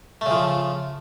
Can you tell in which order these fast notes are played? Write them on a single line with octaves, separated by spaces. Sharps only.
A3 C#3 F3